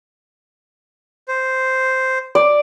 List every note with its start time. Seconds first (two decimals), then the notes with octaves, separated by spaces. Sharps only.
1.28 C5
2.35 D5